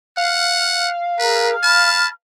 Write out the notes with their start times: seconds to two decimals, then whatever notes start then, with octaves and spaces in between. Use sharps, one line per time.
0.17 F5 F#5
1.19 G#4 A#4 B4 A#5
1.63 A5 B5 F6